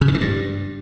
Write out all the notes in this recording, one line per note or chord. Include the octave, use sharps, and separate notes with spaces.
C#3
D#3
E3
G2